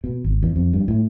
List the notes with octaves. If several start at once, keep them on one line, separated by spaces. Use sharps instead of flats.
B2
G#1
E2
F2
G2
A2